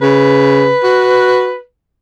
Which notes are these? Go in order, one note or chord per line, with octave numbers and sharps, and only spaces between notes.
C#3 B4
F#4